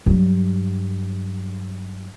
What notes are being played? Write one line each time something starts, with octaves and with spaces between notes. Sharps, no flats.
G2 F#3